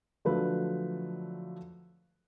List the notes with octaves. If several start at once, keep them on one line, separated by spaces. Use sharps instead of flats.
D3 F3 F#3 A3 B4